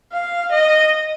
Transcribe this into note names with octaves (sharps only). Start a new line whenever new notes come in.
F5
D#5